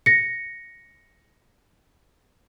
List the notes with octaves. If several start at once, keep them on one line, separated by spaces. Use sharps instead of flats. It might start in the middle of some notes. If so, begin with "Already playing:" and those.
A#6 C#7